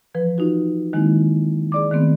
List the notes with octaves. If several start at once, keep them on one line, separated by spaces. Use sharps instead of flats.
E3 F3 B4
D#4 F4 F#4
D#3 G#3 A#3 C4 D#4 E4
G#4 D5 D6
D#3 A3 B3 C4